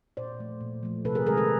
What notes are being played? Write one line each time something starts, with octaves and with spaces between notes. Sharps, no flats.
A#2 C5 D5
F3 A3
A#2
F3 A3
C3 A4 B4
G#4 A#4
D#3 G#3 G#4 A#4
A4 B4